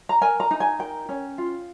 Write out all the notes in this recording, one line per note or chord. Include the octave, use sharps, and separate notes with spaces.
A#5
A#4 G#5
A#5
D#4
G#5
A#4 G5
C#4
F4